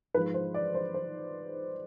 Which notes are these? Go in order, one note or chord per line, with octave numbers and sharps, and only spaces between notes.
G#2 F3 G#3 B4
C5
D5
C5
C5